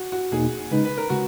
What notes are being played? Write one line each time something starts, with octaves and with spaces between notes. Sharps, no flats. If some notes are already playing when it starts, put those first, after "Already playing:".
Already playing: F#4
F#4
E2 B2 A#3 D#4 G#4
C#3 G#3 D#4 B4
B4
A#4
C#3 G#3 F#4